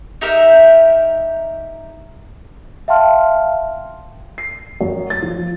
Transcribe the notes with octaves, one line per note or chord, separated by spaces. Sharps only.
D#4 G4 A#4 E5
E5 F5 G5 A5 C6 F6
C7
F#2
A6
F3